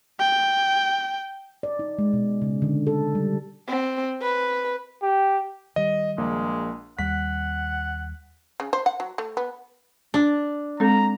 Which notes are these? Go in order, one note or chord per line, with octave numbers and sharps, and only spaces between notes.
G5
D5
D#4
G#3
B2
C#3
D3
A4
G3
C4
B4
G4
D#3 G3 D#5
A#1 G#3 A#3
D#2 G3 F#5 B6
C#3
C5
F#5
F#3
A3
B3
D4
G#3 C4 A4 A#5